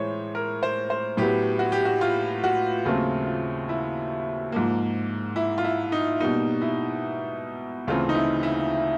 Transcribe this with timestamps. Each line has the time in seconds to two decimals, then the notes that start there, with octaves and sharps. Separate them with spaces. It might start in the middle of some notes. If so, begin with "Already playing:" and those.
Already playing: A2 E3 G#3 C5 C#5
0.35 A#4
0.63 C5
0.90 C5
1.17 A2 F#3 B3 G4
1.59 F#4
1.72 G4
1.85 F#4
2.01 F4
2.44 F#4
2.85 D#2 C#3 F#3 A3 C4 F4
3.27 F4
3.69 E4
4.52 G#2 F3 A#3
5.36 E4
5.58 F4
5.64 E4
5.92 D#4
6.20 B2 G3 A#3 D#4
6.62 E4
7.87 D2 C#3 E3 A3 C4 F4
8.09 D#4
8.15 E4
8.43 E4